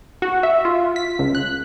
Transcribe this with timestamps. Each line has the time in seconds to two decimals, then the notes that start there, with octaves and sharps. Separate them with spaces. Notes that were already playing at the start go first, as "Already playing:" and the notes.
0.22 F#4
0.43 E5
0.65 F4
0.96 B6
1.19 C#2
1.35 F#6